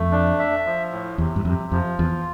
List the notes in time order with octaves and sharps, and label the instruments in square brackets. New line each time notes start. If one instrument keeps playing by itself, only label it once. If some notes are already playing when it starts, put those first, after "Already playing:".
Already playing: [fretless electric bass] F2 [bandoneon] A3
[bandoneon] D4
E5
F3
A2
[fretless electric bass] E2 [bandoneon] C3
[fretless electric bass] G2
[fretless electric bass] F2 [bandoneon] C3
[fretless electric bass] F2 [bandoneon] F3
[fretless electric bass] E2 [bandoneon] F4